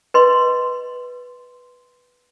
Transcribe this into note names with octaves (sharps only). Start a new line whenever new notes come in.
B4 D#5 C6